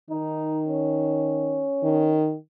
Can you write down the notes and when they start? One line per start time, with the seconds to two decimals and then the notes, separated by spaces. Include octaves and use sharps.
0.10 D#3 D#4
0.68 C#4
1.84 D#3